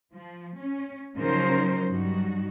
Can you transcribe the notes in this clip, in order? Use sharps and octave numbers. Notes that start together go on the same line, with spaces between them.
F3
C#4
C#3 F3 F#3 D#4 A#4 C5
G2 F#3 G3 D#4 F#4